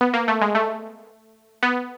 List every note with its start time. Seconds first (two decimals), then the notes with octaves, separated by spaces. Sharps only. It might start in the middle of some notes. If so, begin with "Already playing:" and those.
0.01 B3
0.14 A#3
0.28 A3
0.41 G#3
0.55 A3
1.63 B3